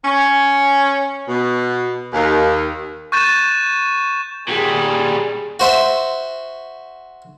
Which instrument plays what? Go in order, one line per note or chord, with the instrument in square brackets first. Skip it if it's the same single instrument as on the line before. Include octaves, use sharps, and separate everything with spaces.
[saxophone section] C#4
B2
D#2
[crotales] C#6 F#6 G6 A6 D#7 E7
[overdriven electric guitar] A#2 G3 [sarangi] G#4
[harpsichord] F#4 C5 E5